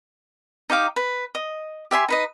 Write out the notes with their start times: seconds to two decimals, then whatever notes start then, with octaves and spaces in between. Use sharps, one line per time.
0.70 D#4 G4 F5 D6
0.96 B4
1.35 D#5
1.91 G4 E5 G#5 C6
2.08 D#4 B4 D#5